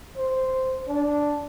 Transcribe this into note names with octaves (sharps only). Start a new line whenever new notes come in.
C5
D4